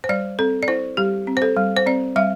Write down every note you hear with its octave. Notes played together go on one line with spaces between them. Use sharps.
C5
G3 D5
C4 A4
D5
E4 C5
G3 G4
C4
C5
A4
G3
C5
C4 D5
G3 E5